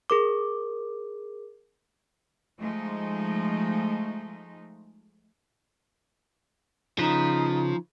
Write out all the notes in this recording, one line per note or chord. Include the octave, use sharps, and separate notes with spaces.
G#4 A#4 D6
F3 G#3 A3 D#4
C#3 F3 D#4 B4